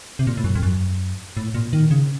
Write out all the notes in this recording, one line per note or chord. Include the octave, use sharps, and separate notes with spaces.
C3
A#2
A2
F#2
F2
F#2
A2
A#2
D#3
C#3